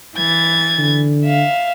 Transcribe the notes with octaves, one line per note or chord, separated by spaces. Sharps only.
E3 G#6 A6
D3
E5 F5